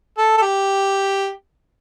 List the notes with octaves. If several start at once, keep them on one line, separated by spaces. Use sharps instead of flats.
A4
A4
G4